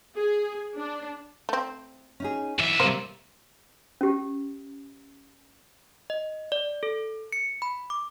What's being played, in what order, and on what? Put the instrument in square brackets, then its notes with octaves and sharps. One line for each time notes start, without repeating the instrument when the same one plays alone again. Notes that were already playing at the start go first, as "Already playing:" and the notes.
[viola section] G#4
D4
[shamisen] A3 C4
[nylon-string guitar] C#4 D#4 G#4
[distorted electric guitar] B1 E5 [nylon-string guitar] E3
[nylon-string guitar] C3 G3 [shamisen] A#3 C5
[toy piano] C#4 G4
[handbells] D#5
D5
A4
C#7
B5
D6